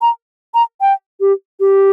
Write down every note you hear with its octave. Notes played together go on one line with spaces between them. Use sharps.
A#5
A#5
G5
G4
G4